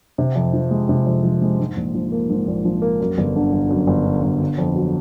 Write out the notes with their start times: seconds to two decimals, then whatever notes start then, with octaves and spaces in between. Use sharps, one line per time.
0.18 C3
0.36 F2
0.54 F3
0.71 G#3
0.89 C3
1.07 F2
1.24 F3
1.42 G#3
1.59 G#2
1.76 A#1
1.94 F3
2.12 A#3
2.29 G#2
2.47 A#1
2.65 F3
2.82 A#3
3.00 F#2
3.18 G1
3.36 D3
3.53 G1
3.71 F#2
3.88 G1
4.05 D3
4.23 G1
4.41 D3
4.58 F2
4.76 F#3